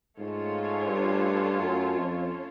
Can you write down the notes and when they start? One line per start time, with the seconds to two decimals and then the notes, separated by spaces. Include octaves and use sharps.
0.18 G#2 A3 C#4 F4 A4 C#5
0.89 G2
1.59 F#2
1.95 F2